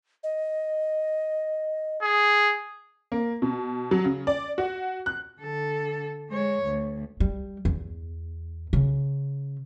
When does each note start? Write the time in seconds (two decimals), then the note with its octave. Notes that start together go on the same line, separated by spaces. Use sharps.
0.23 D#5
2.02 G#4
3.12 A#3
3.42 B2
3.91 F#3
4.05 C#3
4.27 D5
4.58 F#4
5.06 F#6
5.41 D3 A4
6.30 G#3 C#5
6.65 D2
7.20 G3
7.65 E2
8.73 C#3